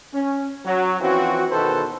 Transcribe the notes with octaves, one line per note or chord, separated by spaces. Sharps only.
C#4
F#3
E3 F3 C4 C#4 F#4
E2 B2 D#3 A4 B4 C5